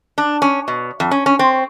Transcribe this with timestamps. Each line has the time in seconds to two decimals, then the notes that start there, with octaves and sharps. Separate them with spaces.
0.18 D4
0.42 C#4
0.68 B2
1.00 F2
1.11 C#4
1.26 C#4
1.39 C4